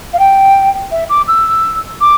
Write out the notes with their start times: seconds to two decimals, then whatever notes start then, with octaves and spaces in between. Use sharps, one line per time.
0.13 F5
0.19 G5
0.91 E5
1.09 D6
1.28 E6
2.01 D6